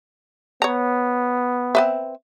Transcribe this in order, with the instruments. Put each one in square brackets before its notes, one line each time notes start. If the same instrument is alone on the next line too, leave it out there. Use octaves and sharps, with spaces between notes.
[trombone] B3 [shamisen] C#5 A#5
[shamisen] C4 B4 E5